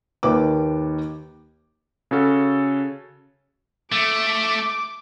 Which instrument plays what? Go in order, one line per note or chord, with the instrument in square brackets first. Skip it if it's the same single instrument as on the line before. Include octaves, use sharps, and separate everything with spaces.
[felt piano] D#2 D#3 B4 D6
[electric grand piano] C#3 C#4 F#4 A4
[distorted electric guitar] A3 [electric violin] D6